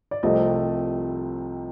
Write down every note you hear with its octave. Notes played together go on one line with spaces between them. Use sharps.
D5
C2 C3 F3 A3 D#5